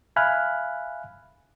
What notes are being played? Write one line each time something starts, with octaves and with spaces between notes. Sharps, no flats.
E5 F5 G#5 B5 F6 F#6